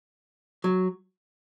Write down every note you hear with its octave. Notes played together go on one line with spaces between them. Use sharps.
F#3